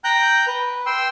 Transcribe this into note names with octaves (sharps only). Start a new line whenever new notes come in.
G5 A#5 F#6 G6
B4
G5 C6 E6